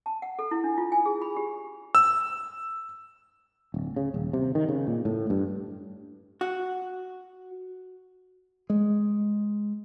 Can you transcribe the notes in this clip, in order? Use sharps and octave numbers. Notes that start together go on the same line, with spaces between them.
A5
F#5
A4
E4
D4
F4
G#5
G#4
B5
G4
E6
D1
C#3
D#1
C3
D#3
C#3
A#2
A2
G2
F#4
G#3